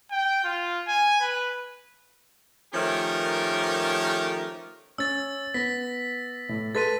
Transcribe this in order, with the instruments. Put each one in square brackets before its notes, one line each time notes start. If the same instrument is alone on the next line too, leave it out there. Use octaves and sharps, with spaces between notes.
[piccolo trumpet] G5
F4
G#5
B4
[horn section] D#3 F3 A3 C#4 G4 A#4
[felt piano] C#4 [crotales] E6 A6
[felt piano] B3 [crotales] A#6 B6
[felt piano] A2
[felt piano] A4 B4 C6 [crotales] A6 B6 D#7